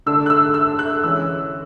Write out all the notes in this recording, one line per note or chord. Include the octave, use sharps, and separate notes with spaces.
D3 A3 D4 E6
F#6
E6
E6
F#6
E3 G#3 C#4 E6